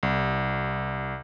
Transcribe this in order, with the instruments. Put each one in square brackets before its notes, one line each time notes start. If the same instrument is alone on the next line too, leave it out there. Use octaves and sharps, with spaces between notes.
[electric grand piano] C2